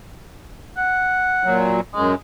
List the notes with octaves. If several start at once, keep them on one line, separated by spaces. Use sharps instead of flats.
F#5
A#2 F#3
F#2 G#3